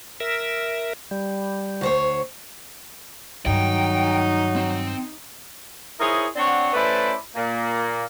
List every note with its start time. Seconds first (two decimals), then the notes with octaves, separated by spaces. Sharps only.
0.20 A#4 E5
1.11 G3
1.81 D2 C5 C#5
3.46 G2 D#3 F#3 D#4 G5
4.56 C4
5.99 D#4 E4 G#4 A#4 C5 C#5
6.36 C4 D4 C#5 D5 F#5
6.73 A3 C#4 E4 B4 C5 D5
7.35 A#2 A#3